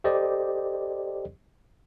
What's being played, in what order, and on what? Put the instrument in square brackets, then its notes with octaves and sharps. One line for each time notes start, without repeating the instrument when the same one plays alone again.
[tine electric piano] G4 A4 C5 D5 D#5